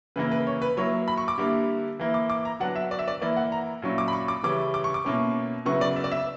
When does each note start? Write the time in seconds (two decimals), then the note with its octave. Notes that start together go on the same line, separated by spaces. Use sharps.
0.16 C#3 E3 A#3 E4 B4
0.31 B4
0.47 C#5
0.62 B4
0.77 F#3 A#3 E4 C#5
1.08 B5
1.18 C#6
1.28 D6
1.38 D3 G3 A#3 E4
1.99 E3 A#3 E4
2.14 D6
2.30 D6
2.45 A#5
2.60 D3 F#3 B3 D4 F#5
2.76 E5
2.91 D5
2.99 E5
3.08 D5
3.21 E3 A#3 E4 D5
3.37 F#5
3.52 A#5
3.82 A#2 F#3 C#4 E4
3.98 D6
4.08 B5
4.13 C#6
4.28 D6
4.43 C#3 E3 G3 C#4 E4 D6
4.74 D6
4.84 C#6
4.94 D6
5.05 B2 A#3 C#4 E4
5.65 C#3 F#3 B3 E4 C#6
5.81 D5
5.96 E5
6.04 D5
6.12 E5